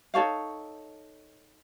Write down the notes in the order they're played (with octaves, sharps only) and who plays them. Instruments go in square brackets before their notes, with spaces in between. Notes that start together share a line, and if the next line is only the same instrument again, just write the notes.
[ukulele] D#4 A4 C#5 F5